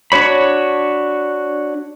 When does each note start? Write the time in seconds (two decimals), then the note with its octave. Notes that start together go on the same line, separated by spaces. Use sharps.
0.12 D4 F#4 C#5 B5